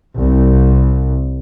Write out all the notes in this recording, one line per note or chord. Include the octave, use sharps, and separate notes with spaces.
C2